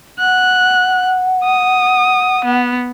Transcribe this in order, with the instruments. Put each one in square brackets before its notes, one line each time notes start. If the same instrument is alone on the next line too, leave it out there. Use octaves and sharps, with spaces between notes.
[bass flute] F#5 [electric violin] F#6
[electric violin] D#6
B3